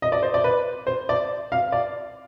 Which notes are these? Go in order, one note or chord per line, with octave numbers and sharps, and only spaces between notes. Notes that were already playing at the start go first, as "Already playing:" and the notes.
D#5
D5
C5
D5
B4
C5
D5
F5
D5